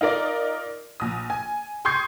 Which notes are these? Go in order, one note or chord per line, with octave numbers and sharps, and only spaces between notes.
D#4 F4 A#4 D5 D#5
A#1 D#6
G#5
C6 C#6 D#6 G6 G#6 C7